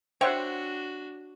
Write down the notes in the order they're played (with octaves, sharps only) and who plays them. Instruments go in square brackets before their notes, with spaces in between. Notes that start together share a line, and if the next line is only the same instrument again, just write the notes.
[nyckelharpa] D4 F#4 [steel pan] C5 E5 F#5 [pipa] C#5 G5 C#6